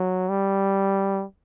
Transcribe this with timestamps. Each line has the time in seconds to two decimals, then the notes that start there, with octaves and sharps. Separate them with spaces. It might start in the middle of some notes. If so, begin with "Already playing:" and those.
Already playing: F#3
0.29 G3